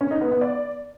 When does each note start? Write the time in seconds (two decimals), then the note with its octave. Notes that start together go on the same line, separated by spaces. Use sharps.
0.01 C#4
0.11 D#4
0.21 B3
0.31 B3
0.41 D5